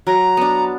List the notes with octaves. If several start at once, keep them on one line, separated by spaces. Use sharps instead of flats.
F#3 A#5
B3 D4